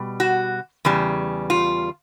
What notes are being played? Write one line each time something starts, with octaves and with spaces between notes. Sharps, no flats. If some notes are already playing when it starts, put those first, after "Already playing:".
Already playing: B2 G3
F#4
E2 C#3 G3
F4